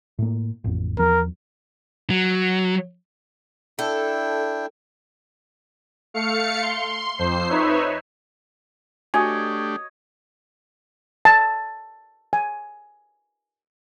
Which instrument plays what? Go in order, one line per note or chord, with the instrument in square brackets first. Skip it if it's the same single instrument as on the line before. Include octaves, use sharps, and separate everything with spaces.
[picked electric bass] A2 A#3
A1 F2
[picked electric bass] E2 F3 [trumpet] A#4
[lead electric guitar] F#3
[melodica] D4 E4 G5 [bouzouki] A4
[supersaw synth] A3 F5 C#7
C6
F2 C5 C7
D#4 B4 C#5 E5
[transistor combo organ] A3 D4 G4 [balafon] F#4 G#5 [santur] C#5 D#5
[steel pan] A5
G#5